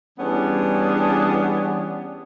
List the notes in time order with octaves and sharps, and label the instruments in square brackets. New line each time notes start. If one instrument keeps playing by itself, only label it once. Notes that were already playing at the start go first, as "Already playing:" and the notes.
[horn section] E3 G3 B3 C#4 D4 G#4